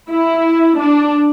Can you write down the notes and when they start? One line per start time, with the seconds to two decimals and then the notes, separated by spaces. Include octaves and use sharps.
0.10 E4
0.80 D4